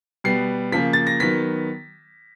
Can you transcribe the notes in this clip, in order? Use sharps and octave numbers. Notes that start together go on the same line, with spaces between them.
B2 G3 B3 C7
C#3 F3 A#3 B6
A6
A#6
D#3 F#3 B3 B6